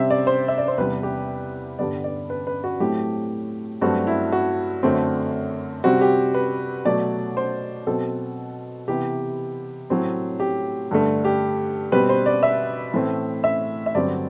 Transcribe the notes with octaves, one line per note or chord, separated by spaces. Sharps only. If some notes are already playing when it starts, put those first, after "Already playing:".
Already playing: C3 G3 C4 E5
D5
C5
E5
D5
C5
E2 C3 G3 B4
G4
G2 D3 G3 B3 D5
D5
B4
B4
F#4
A2 F#3 A3 C4 G4
G2 F#3 A3 C4 F#4
E4
F#4
F#2 D3 A3 C4
C3 G3 C4 F#4
G4
B4
B2 F#3 A3 D5
C5
B2 F#3 C4 A4
C3 E3 B3 G4
A2 F#3 A3 C4
G4
G2 D3 A3
G4
B2 G3 C4 B4
C5
D5
E5
A2 E3 A3 C4
E5
E5
G2 D3 F#3 C4 D5